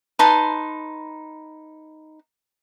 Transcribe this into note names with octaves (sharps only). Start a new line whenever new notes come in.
D#4 B4 A5 C6